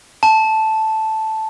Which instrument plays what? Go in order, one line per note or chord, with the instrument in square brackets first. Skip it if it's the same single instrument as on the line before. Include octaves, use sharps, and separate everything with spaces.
[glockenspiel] A5